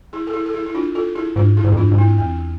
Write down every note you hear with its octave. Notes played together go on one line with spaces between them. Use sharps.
E4 G#4
A4
E4 G#4
A4
E4 G#4
E4
D4 F4
F4 A4
E4 G#4
G#2 D4 F4
E4 G#4
G#2
F2
G#2 D4 F4
G#2
C4 E4
E2 C4